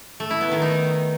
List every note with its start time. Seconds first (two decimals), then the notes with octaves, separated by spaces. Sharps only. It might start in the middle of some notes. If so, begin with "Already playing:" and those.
0.20 A3
0.30 E4
0.41 B3
0.51 D#3
0.62 D#4